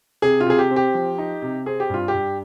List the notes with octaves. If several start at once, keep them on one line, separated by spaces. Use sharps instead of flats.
C3 G#4
F4
C3 G#4
G4
C4
G4
F3
D#4
C3
C4 G#4
G4
G2 F4
G4
G2